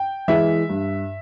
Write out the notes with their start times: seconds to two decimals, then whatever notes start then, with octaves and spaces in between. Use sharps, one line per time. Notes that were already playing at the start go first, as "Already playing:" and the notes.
Already playing: G5
0.28 E3 G#3 E5
0.69 G2